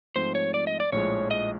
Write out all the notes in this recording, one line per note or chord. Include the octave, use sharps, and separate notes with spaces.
G#2 F3 A3 C4 C5
C#5
D5
D#5
D5
A#1 A2 F3 G#3 C#5
D#5